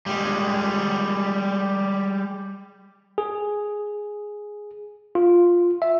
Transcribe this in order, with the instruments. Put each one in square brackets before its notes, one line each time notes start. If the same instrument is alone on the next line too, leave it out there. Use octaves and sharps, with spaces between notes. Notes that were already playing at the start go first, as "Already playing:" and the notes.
[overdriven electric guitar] G3 G#3
[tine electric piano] G#4
F4
E5